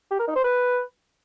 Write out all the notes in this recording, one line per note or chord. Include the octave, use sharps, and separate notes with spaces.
G4
A#4
D#4
C5
B4